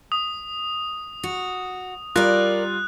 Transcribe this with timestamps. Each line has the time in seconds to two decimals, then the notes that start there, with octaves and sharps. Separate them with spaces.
0.12 D#6
1.23 F#4
2.16 G3 F4 A#4 D5 F#6